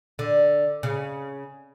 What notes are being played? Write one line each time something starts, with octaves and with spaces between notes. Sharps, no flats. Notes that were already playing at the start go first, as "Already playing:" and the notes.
D3
C#3